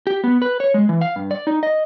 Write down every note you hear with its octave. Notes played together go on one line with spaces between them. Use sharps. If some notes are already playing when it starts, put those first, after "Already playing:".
G4
B3
B4
C#5
G#3
E3
F5
G2
D5
D#4
D#5